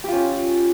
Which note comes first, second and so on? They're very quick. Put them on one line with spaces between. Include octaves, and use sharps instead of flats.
G4 F4 C#4